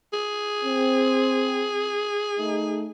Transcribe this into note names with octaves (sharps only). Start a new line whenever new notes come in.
G#4
C4
A3 D#4